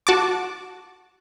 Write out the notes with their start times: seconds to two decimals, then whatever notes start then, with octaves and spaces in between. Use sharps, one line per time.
0.07 F#4 A5 D6